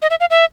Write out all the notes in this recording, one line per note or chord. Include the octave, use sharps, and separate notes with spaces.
D#5
E5
F5
E5